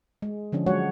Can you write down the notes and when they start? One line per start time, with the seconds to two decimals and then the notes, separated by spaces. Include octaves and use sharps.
0.22 G#3
0.52 D3 F3 C#4 D4
0.66 F#3 G#3 F#4 C#5 F#5